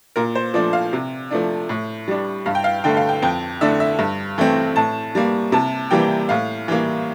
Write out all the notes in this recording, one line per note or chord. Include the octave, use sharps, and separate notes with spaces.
A#2 A#4
C5
F3 A3 D4 D5
F5
C3
F3 A3 D4
A2
G3 D4
G2 F5
G5
F5
D3 A3 G5
F5
G5
F2 G5
D3 A3 D4 E5
E5
G2
E3 A3 C4
A2 A5
G3 A#3
C3 A5
E3 G3 A#3 G5
A2 F5
E3 G3 A#3